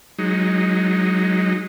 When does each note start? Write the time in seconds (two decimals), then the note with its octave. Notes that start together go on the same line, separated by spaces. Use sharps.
0.18 F#3 G#3 D#4